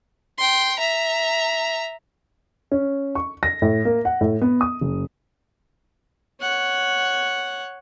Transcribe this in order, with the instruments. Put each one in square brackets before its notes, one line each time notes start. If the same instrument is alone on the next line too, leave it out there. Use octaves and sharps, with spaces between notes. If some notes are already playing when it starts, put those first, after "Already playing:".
[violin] G5 C6
E5 A#5
[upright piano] C#4
C#6
A#6
A2
A#3
F#5
A2
B3
D#6
F#1
[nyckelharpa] C#5 F#5